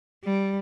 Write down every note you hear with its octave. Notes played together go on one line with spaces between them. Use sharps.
G3